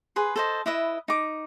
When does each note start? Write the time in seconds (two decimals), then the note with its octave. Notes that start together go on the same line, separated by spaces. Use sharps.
0.16 G#4 B4 C6
0.36 A4 C5 D#5
0.66 E4 B4 D#5 E5
1.08 D#4 D6